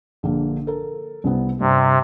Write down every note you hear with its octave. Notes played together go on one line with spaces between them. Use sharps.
A#1 D3 A#3
A4 A#4
C2 C3 B3
G2 C3